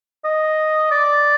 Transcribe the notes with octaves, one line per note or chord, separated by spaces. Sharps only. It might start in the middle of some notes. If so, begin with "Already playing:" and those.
D#5
D5